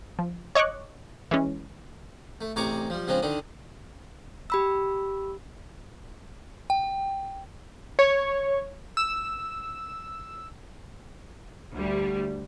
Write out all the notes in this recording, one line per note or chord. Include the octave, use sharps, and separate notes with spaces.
F3
C#5 D#5 C#6 D6 F#6
E3 G#3 C#4
A3
A1 C3 G#4 A#5 C#6 D6
F3 G3
C#3 F3 G#3 C4 D4
D3 D#3 D4 D#6
G4 B5 E6
G5
C#5
E6
D2 G3